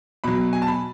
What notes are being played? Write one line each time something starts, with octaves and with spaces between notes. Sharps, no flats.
B2 F#3 B5
G#5
A5
B5